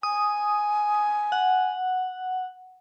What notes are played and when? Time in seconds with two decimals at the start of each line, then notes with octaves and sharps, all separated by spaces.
0.03 G#5 D#6
1.32 F#5